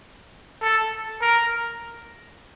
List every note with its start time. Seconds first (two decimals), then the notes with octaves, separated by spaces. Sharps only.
0.62 A4
1.21 A#4